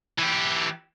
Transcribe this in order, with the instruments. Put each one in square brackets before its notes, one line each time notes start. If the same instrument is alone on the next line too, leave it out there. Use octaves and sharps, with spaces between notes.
[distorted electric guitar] E3 G4